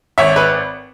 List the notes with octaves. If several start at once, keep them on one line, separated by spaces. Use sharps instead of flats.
G#1 C#5 E5
B4